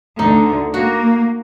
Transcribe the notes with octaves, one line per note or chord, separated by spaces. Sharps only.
D2 D3 D#4
A#3 F#4